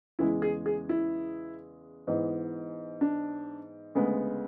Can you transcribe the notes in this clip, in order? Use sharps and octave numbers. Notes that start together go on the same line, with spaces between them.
E2 C#3 E3 G#3 E4
G#4
G#4
E4
G#2 E3 B3
D4
D2 C#3 G#3 B3